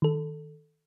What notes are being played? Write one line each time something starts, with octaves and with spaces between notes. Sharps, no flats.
D#3 A4